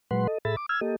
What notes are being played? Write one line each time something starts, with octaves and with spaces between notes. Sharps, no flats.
A#2 F#3 G#3 B4 F#5 C6
A4 D#5
A2 G#4 A4 E5 B5 A6
D6
E6 F6 G#6
A#3 G4 A4 D#5